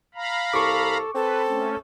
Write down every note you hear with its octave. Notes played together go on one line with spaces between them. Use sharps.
F5 A#5 B5
C2 A4 C#6 D6
C4 A4 B4
A3 C#4